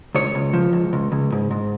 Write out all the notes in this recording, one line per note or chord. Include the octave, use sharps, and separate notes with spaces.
C#2 C#5
C#2
F3
C#2
C#2
C#2
G#2
G#2